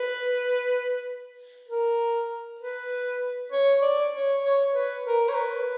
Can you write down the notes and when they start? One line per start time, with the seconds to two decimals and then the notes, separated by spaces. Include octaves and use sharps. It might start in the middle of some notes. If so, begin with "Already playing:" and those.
Already playing: B4
1.69 A#4
2.61 B4
3.52 C#5
3.82 D5
4.13 C#5
4.44 C#5
4.74 B4
5.05 A#4
5.29 C#5
5.34 B4